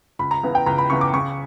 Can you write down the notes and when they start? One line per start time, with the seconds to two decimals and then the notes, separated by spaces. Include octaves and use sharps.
0.19 C#2 B5
0.31 A#5
0.43 C#3 E3 B3
0.55 G5
0.66 C#2 A#5
0.78 B5
0.90 C#3 E3 B3 C#6
1.01 D6
1.14 C#3 C#6